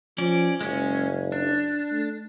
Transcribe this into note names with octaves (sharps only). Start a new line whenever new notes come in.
F3 C#4 D5
F#1 G#3 C#4
D4
A3